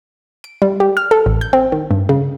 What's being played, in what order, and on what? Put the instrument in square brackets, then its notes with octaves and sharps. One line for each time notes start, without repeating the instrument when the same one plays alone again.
[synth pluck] D7
G3
G4
F6
A4
A1
G6
C4
D#3
G2
C#3